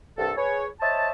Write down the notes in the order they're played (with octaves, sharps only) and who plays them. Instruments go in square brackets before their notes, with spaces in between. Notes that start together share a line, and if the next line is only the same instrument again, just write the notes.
[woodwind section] C2 G2 A4
G#4 B4 C#5
C5 C#5 D#5 E5 A5